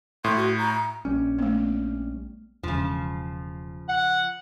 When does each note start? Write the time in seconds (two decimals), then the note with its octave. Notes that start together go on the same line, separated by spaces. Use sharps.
0.24 A2 C6
0.37 F#4
0.58 A#5
1.05 A#1 G3 C#4
1.39 A3 B3
2.63 E1 C#3 F3
3.89 F#5